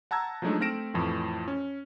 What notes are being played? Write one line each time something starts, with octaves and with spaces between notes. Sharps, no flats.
F#5 A5 A#5 E6 G#6
F3 F#3 G#3 A3 D4 D#4
A3 C4 F6 A#6 D7 E7
F2 A2 E3 F3
C#4